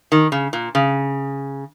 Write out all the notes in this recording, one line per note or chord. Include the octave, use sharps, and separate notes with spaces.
D#3
C#3
A#2
C#3